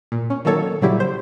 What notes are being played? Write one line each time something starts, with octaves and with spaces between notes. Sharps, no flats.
A#2
C#4
D#3 F#3 A#3 A4 C#5
A#2 C#3 F#3 G3 E4 G4
C5